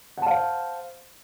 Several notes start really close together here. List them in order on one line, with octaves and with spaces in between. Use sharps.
F#5 A5 F5 C5